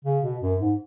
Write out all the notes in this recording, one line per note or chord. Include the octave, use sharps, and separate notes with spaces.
C#3
B2
F#2
G#2